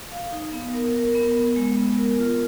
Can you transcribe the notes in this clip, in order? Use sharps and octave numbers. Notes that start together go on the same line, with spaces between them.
F5
D#4
B3
A#4
A#4
B3
B3
G#3
B3
A#4
F4